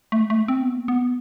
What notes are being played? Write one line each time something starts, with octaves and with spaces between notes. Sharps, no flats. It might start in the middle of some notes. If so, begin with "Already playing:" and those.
A3
A3
C4
B3
A#3
B3